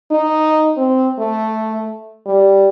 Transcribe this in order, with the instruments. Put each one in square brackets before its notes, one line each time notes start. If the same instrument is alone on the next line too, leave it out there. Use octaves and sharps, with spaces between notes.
[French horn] D#4
C4
A3
G3